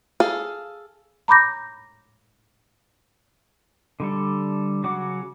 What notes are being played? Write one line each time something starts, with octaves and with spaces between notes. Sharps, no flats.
G#4 A4 F5
A#5 B5 D6 G6 A#6
D3 G3 A4
C#3 F#3 F#4 F#5 D6